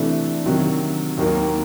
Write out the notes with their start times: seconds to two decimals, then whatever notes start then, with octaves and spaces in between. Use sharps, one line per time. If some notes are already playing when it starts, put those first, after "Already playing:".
Already playing: C3 E3 A3 D4
0.46 C3 D#3 F#3
1.17 D#2 D#3 F#3 A#3